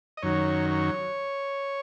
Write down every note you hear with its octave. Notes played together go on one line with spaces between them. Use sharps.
D#5
F#2 D#3 F#3 C#5
C#5